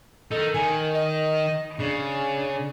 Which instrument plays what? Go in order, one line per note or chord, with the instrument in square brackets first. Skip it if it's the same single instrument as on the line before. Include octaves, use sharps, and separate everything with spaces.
[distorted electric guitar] D#4 A#4 [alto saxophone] A4
[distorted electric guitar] D#3 [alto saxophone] G#5
[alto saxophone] D#5
[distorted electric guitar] C#3 [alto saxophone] D4